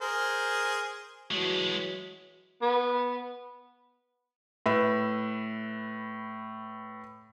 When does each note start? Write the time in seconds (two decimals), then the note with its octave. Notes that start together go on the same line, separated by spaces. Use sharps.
0.01 G#4 A#4 C5
1.31 E3 F#3 G#3 A3 F#4
2.62 B3
4.66 A2 B4 E5